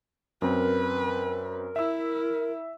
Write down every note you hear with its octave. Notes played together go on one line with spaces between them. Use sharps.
F#2 C4 A#4 B4
E4 E5 E6